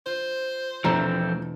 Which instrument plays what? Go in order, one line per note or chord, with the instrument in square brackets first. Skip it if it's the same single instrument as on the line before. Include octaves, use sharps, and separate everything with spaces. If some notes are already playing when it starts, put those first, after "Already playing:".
[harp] F4 [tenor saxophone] C5
[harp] E1 [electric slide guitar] F3 A3 C4 [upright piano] A#5